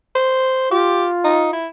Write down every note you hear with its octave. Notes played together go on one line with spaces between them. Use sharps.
C5
F4 G4
D#4
E4